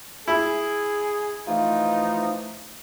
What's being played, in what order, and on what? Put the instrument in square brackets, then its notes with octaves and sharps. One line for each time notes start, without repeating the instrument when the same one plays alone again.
[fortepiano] E4 [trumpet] G#4
[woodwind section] E3 F3 A3 [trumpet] D#4 [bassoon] F4